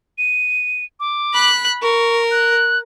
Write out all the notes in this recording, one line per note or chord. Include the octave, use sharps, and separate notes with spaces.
D#7
D6
B5 F#6
A#4 C#6
F#6